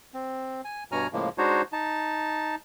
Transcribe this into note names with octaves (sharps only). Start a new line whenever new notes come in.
C4
G#5
G2 B2 C#5 G#5 A#5 F6
A2 C#3 F3 G#3 A#3
G#3 D4 D#4 F#4 C5 C#5
D#4 A5